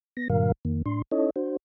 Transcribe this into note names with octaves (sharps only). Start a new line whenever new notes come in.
B3 A#6
G2 A#2 D3 F#3 A#4 F5
F2 D#3 A#3
A2 D4 C6
C#4 D#4 E4 A4 C#5 D#5
D4 F#4 C5